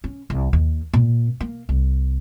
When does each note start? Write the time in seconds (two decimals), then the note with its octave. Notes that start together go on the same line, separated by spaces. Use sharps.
0.04 C#4
0.30 C2
0.53 D#2
0.93 A#2
1.40 A#3
1.69 C2